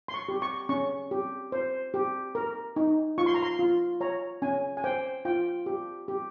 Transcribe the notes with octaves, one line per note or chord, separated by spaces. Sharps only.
C6
C#6
G4
C#6
C#4 C#6
G4
C5
G4
A#4
D#4
F4 C#6
C6
A#5
C6
F4
C#5 A#5
C#4 G#5
G#5
C5 G5
F4 G5
G4
G4